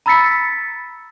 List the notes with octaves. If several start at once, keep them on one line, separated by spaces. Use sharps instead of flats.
A#5 B5 E6 A6 B6 C#7